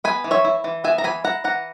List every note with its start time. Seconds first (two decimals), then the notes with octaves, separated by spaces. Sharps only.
0.04 B3 G#5 B5
0.24 E3
0.31 C#5 E5
0.45 E4
0.64 E3
0.84 B3 E5 G#5
0.98 A#5
1.04 E3 G#5 B5
1.24 E4 F#5 A#5
1.44 E3 F#5 A#5